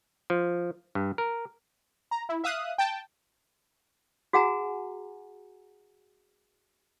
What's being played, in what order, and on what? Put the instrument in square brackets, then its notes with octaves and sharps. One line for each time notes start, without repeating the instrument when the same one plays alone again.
[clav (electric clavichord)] F3
G2
A#4
[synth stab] A#5
E4
E5 F5 D#6 F#6
G5 A5
[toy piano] F#4 G#4 F#5 G#5 A#5